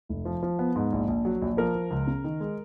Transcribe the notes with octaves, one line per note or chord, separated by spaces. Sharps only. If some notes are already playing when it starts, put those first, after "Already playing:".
F1
F3
F3
B3
G#2
A#1
A#1
F#3
A#1
F3 A#4
F3
C#2
C#3
D#3
G#3